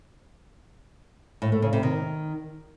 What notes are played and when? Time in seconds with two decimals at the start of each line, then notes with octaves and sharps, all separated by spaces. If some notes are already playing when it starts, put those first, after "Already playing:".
1.42 A2
1.52 A3
1.62 C#3
1.73 C3
1.83 D#3